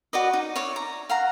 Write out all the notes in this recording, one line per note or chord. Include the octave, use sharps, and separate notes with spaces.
F#4 B4 D5 D#5
D#4
C#5 D5 E5
A#5
F5 F#5 A#5